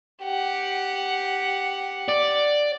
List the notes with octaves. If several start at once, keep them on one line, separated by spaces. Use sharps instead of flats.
G4 F#5
D5